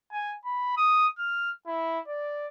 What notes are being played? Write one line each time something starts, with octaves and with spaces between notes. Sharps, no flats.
G#5
B5
D#6
F6
E4
D5